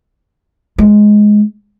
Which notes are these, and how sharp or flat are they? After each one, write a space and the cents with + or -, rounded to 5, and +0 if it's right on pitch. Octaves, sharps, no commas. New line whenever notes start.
G#3 +10